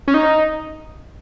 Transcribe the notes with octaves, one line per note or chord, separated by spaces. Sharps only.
C#4
D#4